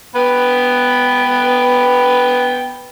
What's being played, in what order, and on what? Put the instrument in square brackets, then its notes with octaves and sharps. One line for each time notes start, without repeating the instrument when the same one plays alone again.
[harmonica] B3 B4 G5